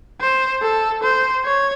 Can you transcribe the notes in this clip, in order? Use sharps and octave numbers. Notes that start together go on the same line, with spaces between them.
C5
A4
C5
C#5